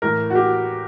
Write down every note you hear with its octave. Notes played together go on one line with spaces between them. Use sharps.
A2 E3 A#4
F#4
G4